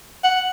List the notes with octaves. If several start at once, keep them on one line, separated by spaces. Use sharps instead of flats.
F#5